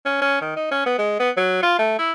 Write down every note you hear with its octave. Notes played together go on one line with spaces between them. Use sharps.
C#4
C#4
D#3
D#4
C#4
B3
G#3
B3
F#3
F4
A3
E4